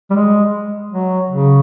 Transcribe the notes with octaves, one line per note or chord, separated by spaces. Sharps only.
G3
G#3
F#3
C#3